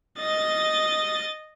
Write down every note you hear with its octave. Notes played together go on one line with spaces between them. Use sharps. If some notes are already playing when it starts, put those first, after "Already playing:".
D#5 A6